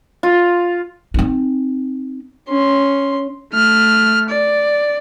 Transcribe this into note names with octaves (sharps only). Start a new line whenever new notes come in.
F4
C4 D#4
C#4 C6
A3 F6
D5